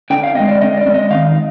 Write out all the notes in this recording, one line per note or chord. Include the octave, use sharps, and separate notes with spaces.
D3 G5
F5
G#3 C4 D#5
D5
D3 D#5
D5
G#3 C4
D#5
D#3 F5